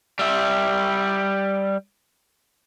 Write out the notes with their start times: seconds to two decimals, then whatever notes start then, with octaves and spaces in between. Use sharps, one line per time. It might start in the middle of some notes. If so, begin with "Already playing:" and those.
0.19 G3 E5